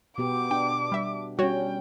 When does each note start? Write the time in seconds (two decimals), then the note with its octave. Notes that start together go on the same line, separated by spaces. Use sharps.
0.18 B2 B3 G4 D6
0.51 D4 G5
0.92 G3 E5
1.39 G3 C#4 F#4 C#5 G5